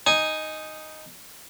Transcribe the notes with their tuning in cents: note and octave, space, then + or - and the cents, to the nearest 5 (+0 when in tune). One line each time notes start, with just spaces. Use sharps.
D#4 +0 G#5 +0